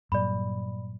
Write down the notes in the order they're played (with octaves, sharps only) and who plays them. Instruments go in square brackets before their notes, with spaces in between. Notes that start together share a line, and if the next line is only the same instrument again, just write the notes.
[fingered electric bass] G2 A#2 F#3 [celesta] D5 B5